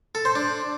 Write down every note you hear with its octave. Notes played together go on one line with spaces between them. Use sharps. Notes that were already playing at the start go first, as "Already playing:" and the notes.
A4
C5
D4